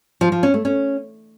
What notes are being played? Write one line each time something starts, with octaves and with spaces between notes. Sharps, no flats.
F3
F3
C#4
A3
C#4